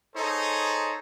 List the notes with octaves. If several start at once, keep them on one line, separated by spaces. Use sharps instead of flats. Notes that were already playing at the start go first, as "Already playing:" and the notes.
D#4 G#4 A4 C5 C#5